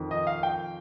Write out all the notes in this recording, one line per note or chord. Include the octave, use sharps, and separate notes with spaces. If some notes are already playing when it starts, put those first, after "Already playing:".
Already playing: F2 D#3
D#5
F5
G5